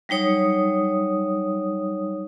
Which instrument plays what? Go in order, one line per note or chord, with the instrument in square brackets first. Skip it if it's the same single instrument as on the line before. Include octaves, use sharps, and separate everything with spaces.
[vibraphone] F#3 G3 D#4 C#5 D#6